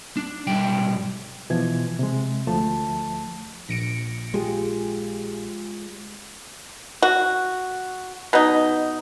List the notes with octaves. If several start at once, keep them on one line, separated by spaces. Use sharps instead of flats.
D4
B1 G#2 G3 G5
B2 E3 F3 G#6
C3 G#3
D2 F3 A3 A5
A#1 A#6 C#7 D7
G#3 F4 G4 G#4
F#4
B2 D#4